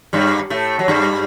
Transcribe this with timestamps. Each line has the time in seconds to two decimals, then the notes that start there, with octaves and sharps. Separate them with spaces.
0.13 G2 G3
0.50 A2 A3
0.79 F#3
0.88 G2 G3